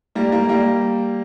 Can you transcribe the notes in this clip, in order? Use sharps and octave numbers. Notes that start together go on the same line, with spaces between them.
G3 A#3
G3 A#3
G3 A#3